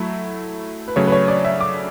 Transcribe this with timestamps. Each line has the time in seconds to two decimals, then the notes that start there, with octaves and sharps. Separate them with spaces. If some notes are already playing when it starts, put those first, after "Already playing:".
Already playing: F#3 A3 E4
0.88 B4
0.96 C#3 F#3 A3 C#5
1.07 B4
1.12 C#5
1.28 D5
1.45 E5
1.61 D6